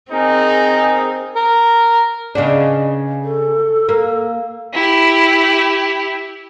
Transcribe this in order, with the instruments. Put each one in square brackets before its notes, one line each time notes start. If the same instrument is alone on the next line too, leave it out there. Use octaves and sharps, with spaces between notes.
[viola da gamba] C4 [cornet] D#4 [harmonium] G#4 A#4
[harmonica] A#4
[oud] C#3 B3 D4 [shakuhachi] D#5
[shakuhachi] A4
[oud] A#3
[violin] E4 G4